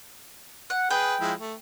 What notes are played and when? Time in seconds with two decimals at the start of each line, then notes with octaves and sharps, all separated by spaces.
0.70 F#5
0.91 G#4 B4 G5
1.20 F3 G#3 E4
1.40 A3